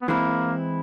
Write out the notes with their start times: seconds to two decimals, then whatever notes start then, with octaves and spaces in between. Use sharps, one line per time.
0.02 B3
0.08 E3 G#3 A#3 C4 E4